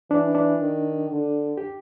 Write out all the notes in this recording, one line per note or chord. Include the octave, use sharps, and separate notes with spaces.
E3 D4
D4
D#3
D3
G4